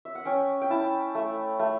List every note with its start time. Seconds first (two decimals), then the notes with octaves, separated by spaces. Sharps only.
0.05 E5
0.15 F#5
0.25 C#4 G5
0.62 G5
0.70 E4 A5
1.15 A3
1.59 A3